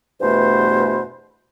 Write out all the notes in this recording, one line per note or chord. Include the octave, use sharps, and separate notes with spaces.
E2 G2 B2 A3 C5